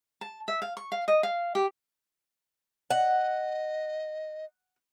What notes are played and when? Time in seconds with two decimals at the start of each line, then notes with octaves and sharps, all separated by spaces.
0.21 A5
0.48 E5
0.62 F5
0.77 C#6
0.92 F5
1.08 D#5
1.23 F5
1.55 G4
2.90 D#5 F#5